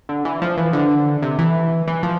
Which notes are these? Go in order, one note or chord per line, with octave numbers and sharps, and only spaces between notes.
D3
E3
F3
E3
D3
C3
E3
E3
F3